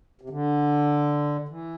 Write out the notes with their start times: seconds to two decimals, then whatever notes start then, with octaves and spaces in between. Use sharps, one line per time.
0.21 C3
0.30 D3
1.48 E3